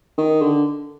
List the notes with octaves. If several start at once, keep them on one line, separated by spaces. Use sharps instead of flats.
D#3
D3